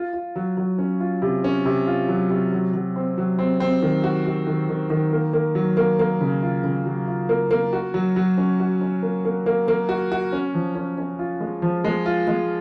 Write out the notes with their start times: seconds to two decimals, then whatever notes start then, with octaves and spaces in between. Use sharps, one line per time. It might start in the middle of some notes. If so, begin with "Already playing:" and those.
Already playing: F4
0.13 F4
0.36 F#3
0.57 F#3
0.78 C#4
1.00 F4
1.22 C3
1.44 C#4
1.65 C3
1.87 F4
2.09 F#3
2.30 C3
2.52 F#3
2.74 F#3
2.96 C4
3.18 F#3
3.39 C4
3.60 C4
3.82 D#3
4.04 F#4
4.26 F#4
4.47 D#3
4.69 D#3
4.90 D#3
5.13 A#3
5.33 A#3
5.55 F#3
5.77 A#3
5.99 A#3
6.21 C#3
6.43 F4
6.64 C#3
6.86 F#3
7.08 F4
7.29 A#3
7.51 A#3
7.73 F#4
7.94 F#3
8.16 F#3
8.38 C#4
8.60 F#4
8.81 C#4
9.02 A#3
9.25 A#3
9.46 A#3
9.68 A#3
9.89 F#4
10.12 F#4
10.33 C#4
10.54 F3
10.75 C#4
10.98 C#4
11.19 F4
11.41 G#3
11.62 F3
11.84 G#3
12.06 F4
12.27 G#3